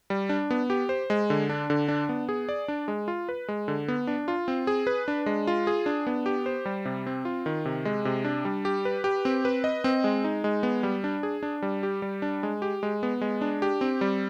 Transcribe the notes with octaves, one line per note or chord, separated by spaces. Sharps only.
G3
D4
B3
G4
C5
G#3
D3
D4
D3
D4
B3
G#4
D5
D4
G#3
F4
B4
G#3
D3
B3
D4
F4
C4
G#4
B4
D4
G#3
F4
G#4
D4
B3
G4
C5
G3
C3
C4
F4
D#3
C3
G#3
C3
D4
G3
G4
B4
G4
C4
B4
D#5
C4
G#3
D#4
G#3
B3
G3
D4
G#4
D4
G3
G4
G3
D4
G#3
G4
G#3
B3
G#3
D4
G4
C4
G3